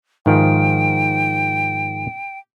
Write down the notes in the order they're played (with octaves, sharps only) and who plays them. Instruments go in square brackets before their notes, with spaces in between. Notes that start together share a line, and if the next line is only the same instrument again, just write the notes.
[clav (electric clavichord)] G#2 D#3 F3 [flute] G5